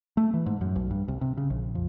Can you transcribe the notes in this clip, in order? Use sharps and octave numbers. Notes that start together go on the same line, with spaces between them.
A3
E3
G#2
F#2
B1
G2
C2
C3
C#3
A#1
F2